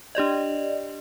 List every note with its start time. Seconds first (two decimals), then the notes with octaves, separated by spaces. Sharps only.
0.15 D4 G4 D5 D#5